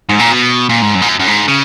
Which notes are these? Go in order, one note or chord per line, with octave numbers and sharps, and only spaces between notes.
G#2
A#2
B2
A#2
G#2
F#2
G#2
F#2
F#2
G#2
C#3